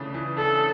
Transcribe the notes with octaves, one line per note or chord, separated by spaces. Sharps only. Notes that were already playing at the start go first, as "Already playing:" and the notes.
Already playing: C#3 E3 A3 D4
E3
D4 A4